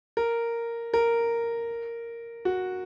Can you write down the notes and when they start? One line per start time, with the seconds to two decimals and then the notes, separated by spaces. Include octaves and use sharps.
0.17 A#4
0.94 A#4
2.45 F#4